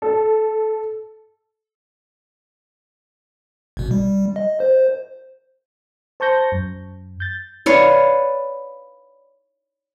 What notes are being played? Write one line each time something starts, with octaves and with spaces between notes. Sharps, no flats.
A4
G#1 B2
G3
D#5
C5
C5 A5 C#6 G6 A#6
F#2
G6 A6
B4 C#5 D5 F5